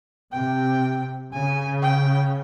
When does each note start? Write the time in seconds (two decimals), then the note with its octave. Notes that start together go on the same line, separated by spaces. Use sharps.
0.33 C3 G5
1.33 C#3 G#5
1.82 G5